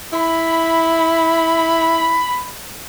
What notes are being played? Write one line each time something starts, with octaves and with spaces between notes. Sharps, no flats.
E4 B5